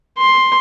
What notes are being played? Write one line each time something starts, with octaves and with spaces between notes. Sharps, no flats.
C6